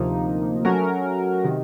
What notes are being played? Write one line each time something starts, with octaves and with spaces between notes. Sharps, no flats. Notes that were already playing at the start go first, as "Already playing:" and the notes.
Already playing: D2 C3 F3 A#3 D#4
F#3 A3 C#4 F#4 A#4
C3 D#3